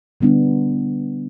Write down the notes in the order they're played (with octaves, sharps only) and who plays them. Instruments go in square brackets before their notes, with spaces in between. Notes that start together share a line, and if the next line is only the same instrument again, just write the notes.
[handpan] D3 G3 B3 D4